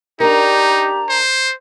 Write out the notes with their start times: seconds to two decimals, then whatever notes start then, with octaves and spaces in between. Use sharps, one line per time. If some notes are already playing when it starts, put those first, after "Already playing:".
0.20 D4 D#4 G4 A#4 A#5
1.09 C5